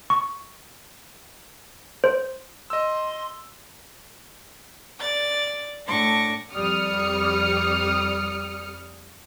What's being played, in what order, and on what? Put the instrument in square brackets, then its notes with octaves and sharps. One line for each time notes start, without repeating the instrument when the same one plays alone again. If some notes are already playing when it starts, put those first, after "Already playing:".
[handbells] C#6
C5
[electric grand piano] D#5 E6 [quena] C6
[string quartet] D5 A6
A2 D4 C#6 D6 A#6
[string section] F2 G3 D#6 F6 C#7